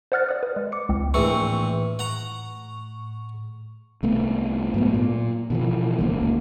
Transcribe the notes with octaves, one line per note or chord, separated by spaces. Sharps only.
C5 D5 F#5 F6 F#6 A6
D5 D#6
B4
G#3
D6 C#7
C#2 C4
A#1 A2 E3 C4 C#6
F#5 A#5
C2 A3 B3
G#2 F#3 B3
A#2
B2 E3 F3
D#1 C#2 A#3